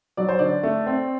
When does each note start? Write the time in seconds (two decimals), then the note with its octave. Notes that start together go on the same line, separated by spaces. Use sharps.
0.17 F#3 D5
0.29 C5
0.39 D3 D5
0.63 A3
0.87 C4